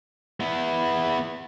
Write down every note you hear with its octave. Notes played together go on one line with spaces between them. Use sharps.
B3 E4